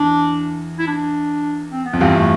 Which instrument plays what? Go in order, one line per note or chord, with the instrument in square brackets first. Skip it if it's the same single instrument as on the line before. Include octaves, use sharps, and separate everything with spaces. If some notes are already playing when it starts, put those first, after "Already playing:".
Already playing: [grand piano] E2 [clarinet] D4
[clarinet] E4
D4
C4
B3
[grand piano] F2
[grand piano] E2 G2 [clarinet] C4
[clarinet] A3